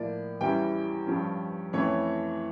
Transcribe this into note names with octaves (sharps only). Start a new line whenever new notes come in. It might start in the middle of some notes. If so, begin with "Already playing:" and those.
Already playing: A2 F3 A#3 D5
E2 E3 G3 C#4 E4 G5
G2 F3 C#4
F2 E3 A3 C#4 E4 C#5